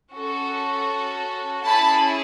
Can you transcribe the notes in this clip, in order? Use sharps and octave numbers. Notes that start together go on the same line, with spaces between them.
C#4 F#4 A4
C#4 E4 G#4 A5 B5